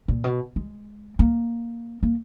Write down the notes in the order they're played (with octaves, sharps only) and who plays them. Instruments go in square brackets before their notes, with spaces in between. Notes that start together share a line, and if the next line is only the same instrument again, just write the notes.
[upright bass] A#2
B2
G#3
A#3
A#3